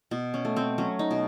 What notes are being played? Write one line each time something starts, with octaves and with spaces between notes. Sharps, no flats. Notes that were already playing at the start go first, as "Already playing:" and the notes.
B2
C#4
A3
C4
F#3 C#4
D#4
B2